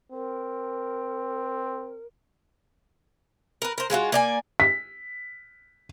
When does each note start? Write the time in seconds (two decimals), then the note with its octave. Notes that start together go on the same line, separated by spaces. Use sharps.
0.12 C4 A#4
3.62 A#4 B4
3.78 A#4 C5
3.90 G#3 A#3 F4 F#4
4.12 A#3 D5 G#5
4.60 B6